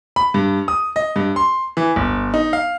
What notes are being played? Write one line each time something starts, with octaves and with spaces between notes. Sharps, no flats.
B5
G2
D#6
D#5
G2
C6
E3
G1
D#4
F5